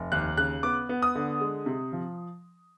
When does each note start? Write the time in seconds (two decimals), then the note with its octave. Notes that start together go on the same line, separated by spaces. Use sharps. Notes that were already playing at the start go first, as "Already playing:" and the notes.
Already playing: F1
0.12 D#2 F#6
0.37 C#3 F#6
0.63 B3 D6
0.89 B3
1.02 D#6
1.15 D3
1.41 G#3
1.66 C3
1.92 F3